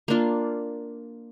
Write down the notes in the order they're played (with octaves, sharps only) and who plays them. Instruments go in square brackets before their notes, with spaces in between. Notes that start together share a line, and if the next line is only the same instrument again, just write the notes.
[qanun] A#3 D4 F4